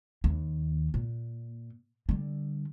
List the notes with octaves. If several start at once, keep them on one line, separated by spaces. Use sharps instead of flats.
D#2
A#2
D3 G3